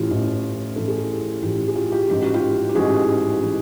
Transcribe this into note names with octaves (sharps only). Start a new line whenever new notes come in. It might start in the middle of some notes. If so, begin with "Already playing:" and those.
Already playing: A1 A2 E3 F4 G4
A1 A2 E3
A1 A2 E3 A4
G#4
G4 A4
A1 A2 E3 F4 G4
G#4
F4 G4
F4 G4
A1 G#2 E3 G4
F#4
F4 G4
G4
A1 G#2 E3 F#4 G#4
E3